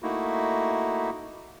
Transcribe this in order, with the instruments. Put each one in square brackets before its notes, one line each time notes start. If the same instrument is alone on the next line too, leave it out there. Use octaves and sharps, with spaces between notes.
[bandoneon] A3 A#3 D#4 E4 F#4